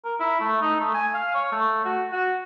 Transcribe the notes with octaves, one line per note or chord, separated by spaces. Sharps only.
A#4
E4
A3
D#4
A3
G#5
F5
C#5
A3
F#4
F#4